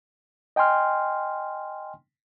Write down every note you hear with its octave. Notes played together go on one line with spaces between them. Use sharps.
D#5 G5 G#5 C6 F6